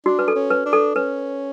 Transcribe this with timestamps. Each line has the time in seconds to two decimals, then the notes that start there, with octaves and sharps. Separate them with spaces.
0.06 D4 F#4
0.19 B4
0.28 A4
0.35 C#4
0.50 B4
0.66 D4
0.73 A4
0.95 C#4 B4